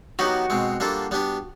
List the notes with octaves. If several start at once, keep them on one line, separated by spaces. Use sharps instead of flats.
F#3 B3 D#4 F#4 G4
B2 G#3 C4
G3 A#3 D4 F4 A4
G3 B3 D4 G4